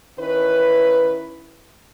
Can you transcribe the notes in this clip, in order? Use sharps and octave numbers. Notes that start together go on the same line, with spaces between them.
D#3 C#4 E4 B4